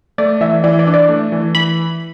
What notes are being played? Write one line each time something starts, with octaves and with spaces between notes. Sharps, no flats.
A3 D5
E3 E5
E3 D5
D5
D4
D5
A3
E3
E3 B5